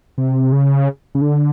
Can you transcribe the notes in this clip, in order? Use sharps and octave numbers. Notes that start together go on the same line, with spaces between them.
C3
C#3
C#3
D3